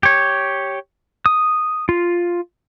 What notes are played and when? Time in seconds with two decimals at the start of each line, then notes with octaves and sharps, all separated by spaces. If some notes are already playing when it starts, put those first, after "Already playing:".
0.03 G4 C#5
1.26 D#6
1.89 F4